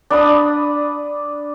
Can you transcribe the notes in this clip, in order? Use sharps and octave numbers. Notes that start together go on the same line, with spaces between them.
D4 B5 D#6